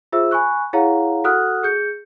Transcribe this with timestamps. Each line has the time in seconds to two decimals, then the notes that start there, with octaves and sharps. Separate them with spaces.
0.12 F4 G#4 C5 E5 E6
0.31 G#5 B5 C#6 F#6
0.73 E4 G#4 C#5 F5 F#5 A#5
1.24 F#4 A4 F#5 D#6 F6 F#6
1.63 G#4 G6 C#7